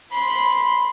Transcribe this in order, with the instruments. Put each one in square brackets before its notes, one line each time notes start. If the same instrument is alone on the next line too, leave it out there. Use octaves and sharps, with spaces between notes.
[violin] B5 C6